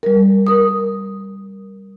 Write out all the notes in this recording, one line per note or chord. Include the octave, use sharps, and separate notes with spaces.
G3 A#4
A#4 D#6